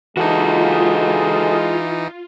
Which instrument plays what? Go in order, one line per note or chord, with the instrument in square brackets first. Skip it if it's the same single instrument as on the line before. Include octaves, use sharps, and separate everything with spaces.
[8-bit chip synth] E3 D#4 [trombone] G#3 [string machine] F4 [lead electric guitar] F#4 A4